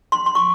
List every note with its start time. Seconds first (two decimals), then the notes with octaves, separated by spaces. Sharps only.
0.12 C6
0.26 C6
0.35 C#6